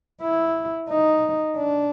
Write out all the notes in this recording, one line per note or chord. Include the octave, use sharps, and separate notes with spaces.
E4
D#4
D4